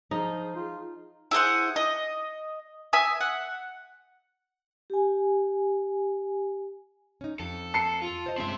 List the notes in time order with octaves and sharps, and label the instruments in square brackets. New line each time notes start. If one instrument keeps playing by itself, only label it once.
[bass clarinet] F3 [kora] D#4 [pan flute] G#4
[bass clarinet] F4
[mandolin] E4 G#4 C5 F#5
D#5
E5 G#5 D#6
F#5
[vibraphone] G4 G#5
[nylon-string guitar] C#4 D#4
[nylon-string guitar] F2 [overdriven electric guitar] A4
[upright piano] A5 C7 C#7
[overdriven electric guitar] F4
[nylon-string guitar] C5 D#5
[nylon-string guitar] G2 G#3 C#4 [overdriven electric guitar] C4 E5